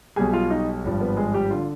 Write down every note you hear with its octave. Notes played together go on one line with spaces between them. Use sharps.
B1 B2 G3 G#4 G#5
F4 F5
D#4 D#5
G#1 G2 F3
B3 B4
G#3 G#4
G3 G4
D3 F4